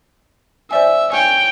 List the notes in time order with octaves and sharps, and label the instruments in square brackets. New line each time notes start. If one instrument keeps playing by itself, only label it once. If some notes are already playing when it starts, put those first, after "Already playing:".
[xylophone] C5 D5 G#5 [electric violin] E5
[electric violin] C#5 G5 [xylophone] G#5